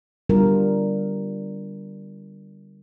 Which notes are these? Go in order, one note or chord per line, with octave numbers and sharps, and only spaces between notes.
D3 G3 B3 D4 F4 A#4